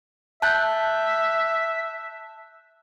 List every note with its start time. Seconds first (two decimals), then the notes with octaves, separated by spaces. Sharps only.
0.42 E5 A5 F#6 G6